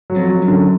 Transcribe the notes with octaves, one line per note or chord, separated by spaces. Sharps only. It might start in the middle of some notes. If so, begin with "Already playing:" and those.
F#3
F2
F#3
F#2
D3